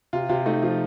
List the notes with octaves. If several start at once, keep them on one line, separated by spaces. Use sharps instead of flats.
C3 F4
C3 F4
A3 D#4
F3 F4